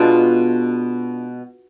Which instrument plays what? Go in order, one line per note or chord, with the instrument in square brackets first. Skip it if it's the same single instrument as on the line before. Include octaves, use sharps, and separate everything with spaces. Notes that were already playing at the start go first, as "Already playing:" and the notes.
Already playing: [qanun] B2 G#3 B3 D4 F4